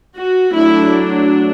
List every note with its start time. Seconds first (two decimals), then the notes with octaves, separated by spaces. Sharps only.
0.13 F#4
0.52 F#3 A3 D4 E4